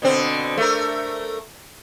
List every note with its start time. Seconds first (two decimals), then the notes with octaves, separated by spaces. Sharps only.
0.02 B2 D3 C4
0.58 A3 A#4